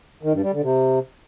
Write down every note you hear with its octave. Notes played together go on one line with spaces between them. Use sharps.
D#3
G2
G3
D3
C3